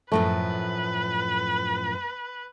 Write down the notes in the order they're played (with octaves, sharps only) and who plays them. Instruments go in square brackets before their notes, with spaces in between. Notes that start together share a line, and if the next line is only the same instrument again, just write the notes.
[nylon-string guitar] F#2 A2 F3 [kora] A3 [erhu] B4